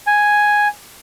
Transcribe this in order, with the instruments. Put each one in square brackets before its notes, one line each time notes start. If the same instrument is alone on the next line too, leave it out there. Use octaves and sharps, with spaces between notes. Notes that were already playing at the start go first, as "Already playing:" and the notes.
[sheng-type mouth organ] G#5